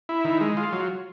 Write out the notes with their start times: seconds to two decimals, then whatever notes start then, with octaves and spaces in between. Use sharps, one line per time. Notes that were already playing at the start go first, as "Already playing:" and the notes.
0.09 E4
0.24 D#3
0.41 G#3
0.57 F4
0.73 F#3